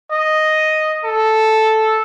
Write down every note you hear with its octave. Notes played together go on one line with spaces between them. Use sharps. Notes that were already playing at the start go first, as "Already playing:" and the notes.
D#5
A4